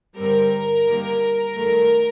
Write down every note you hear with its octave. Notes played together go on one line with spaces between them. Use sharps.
G2 D3 G3 C4 A#4
G2 D#3 G3 A#3
G2 D#3 F#3 A3